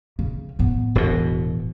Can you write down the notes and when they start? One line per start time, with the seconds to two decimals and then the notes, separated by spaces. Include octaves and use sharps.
0.19 C#3
0.59 A2 B3
0.95 E1 B2